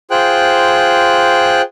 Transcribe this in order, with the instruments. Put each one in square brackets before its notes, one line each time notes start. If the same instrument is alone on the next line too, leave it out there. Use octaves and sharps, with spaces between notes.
[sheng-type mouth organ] F4 G#4 C5 G5 F#6